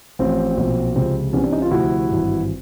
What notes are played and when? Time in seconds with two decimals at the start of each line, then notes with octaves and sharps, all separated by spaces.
0.19 A1 A2 F3 C4
0.57 B1 A#2 F3
0.96 C#2 C3 F3 C4
1.33 C2 C3 E3 B3 C#4
1.42 C4 D4
1.52 C#4 D#4
1.62 D#4 F4
1.71 D2 C3 F3 E4 F#4
2.09 G#1 G2 E3